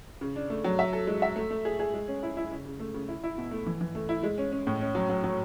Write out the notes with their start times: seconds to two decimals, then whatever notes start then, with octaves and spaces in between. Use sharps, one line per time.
0.21 C#3
0.36 D4
0.50 A3
0.64 F#3
0.79 E5
0.93 A4
1.07 G#3
1.22 E5
1.36 A3
1.51 A3
1.65 G#4
1.80 G#4
1.94 G#3
2.08 C#4
2.23 E4
2.37 E4
2.51 C#3
2.66 C#3
2.80 A3
2.94 C#3
3.08 E4
3.24 E4
3.38 B2
3.51 A3
3.66 E3
3.81 E3
3.95 A3
4.09 E4
4.23 G#3
4.38 C#4
4.52 C#4
4.67 A2
4.81 C#4
4.95 F#3
5.10 F#3
5.24 F#3